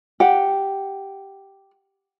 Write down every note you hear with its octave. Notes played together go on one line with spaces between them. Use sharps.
G4 F#5